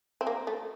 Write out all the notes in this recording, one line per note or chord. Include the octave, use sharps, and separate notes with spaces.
C4
A#3
A3